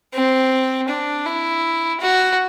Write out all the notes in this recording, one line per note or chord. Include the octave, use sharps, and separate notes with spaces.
C4
D4
E4
F#4